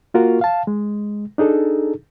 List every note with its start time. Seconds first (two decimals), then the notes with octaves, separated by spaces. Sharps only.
0.14 A#3 F4 F#4 A#4
0.41 F5 A5
0.67 G#3
1.38 D4 D#4 G#4 A4